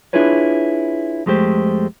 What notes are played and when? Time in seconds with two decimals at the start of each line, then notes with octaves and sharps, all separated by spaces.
0.13 D4 E4 F4 G#4 B4 C#5
1.26 F2 G#3 A3 G4 C5